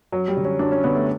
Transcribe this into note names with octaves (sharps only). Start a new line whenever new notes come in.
F#2 F#3
G3
D3
C#4
F#2 D4
C#4
D3 B3
A3